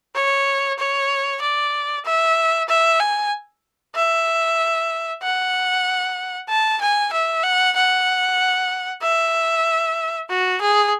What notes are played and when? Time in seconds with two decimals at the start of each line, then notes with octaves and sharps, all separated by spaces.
0.15 C#5
0.79 C#5
1.42 D5
2.05 E5
2.69 E5
3.00 G#5
3.96 E5
5.22 F#5
6.49 A5
6.81 G#5
7.13 E5
7.43 F#5
7.76 F#5
9.02 E5
10.29 F#4
10.61 G#4